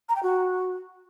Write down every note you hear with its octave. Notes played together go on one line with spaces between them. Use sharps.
A#5
G5
F#4